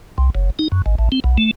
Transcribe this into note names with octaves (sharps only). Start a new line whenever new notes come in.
C2
F#1
D#4
F#2
G#1
A1
C4
B1
A3